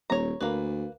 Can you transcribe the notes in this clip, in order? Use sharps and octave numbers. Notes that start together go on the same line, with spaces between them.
D#1 C#5 A#5
D2 A#3 B4